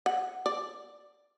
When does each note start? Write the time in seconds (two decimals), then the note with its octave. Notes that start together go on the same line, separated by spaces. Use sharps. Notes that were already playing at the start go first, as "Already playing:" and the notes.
0.06 F#5
0.46 D5